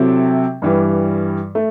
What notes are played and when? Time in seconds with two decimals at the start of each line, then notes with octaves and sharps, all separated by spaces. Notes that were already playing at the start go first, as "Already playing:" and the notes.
Already playing: C3 F#3 C4 E4 A4
0.62 G2 E3 G3
1.55 A3